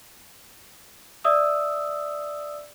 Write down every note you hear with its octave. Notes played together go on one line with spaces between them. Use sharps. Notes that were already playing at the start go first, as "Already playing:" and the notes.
D5 E5 D#6 E6